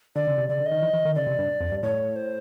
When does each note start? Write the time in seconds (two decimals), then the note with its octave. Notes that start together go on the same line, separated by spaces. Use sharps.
0.16 D3 D5
0.27 C#3
0.38 C3
0.49 C#3 D5
0.60 D3
0.66 D#5
0.71 D#3
0.82 E3
0.93 E3
1.05 D#3
1.15 C#3 D5
1.27 C3
1.39 G2
1.60 F2
1.71 G2
1.83 A2 C#5
2.16 C5